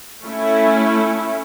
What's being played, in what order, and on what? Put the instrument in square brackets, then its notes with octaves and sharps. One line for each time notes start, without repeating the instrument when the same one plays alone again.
[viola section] A3 C#4 E4